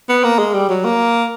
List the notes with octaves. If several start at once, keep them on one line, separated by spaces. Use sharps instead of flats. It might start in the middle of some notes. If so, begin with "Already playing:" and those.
B3
A#3
G#3
G3
F#3
A#3